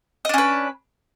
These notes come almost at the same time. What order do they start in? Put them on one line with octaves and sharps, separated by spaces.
D#5 D4 C#4 B4